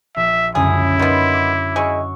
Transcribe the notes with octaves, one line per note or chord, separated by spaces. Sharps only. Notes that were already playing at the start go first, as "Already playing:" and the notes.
A#1 E5
C#2 F#2 D3 E4 G#4
D#3 B3 B5 C6
D6
G#3 F#5 C#6 E6